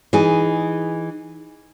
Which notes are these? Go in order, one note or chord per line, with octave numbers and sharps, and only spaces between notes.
E3 D#4 G#4